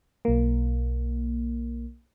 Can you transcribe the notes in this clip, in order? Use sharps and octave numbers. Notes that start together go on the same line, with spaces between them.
B1 A#3